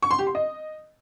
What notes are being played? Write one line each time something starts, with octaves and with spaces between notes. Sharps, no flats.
C#6
C6
G4
C6
D#5